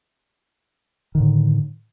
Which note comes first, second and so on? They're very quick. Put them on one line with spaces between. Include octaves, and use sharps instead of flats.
D#3 D3 A2